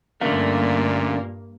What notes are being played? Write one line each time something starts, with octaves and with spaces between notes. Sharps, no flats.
G2 A#2 D3 A3 A#3 C#4 A#4 F5